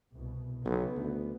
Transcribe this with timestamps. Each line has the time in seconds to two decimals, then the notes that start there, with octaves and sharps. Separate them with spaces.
0.14 C2 B2
0.65 B1 C#3 B3
0.97 D2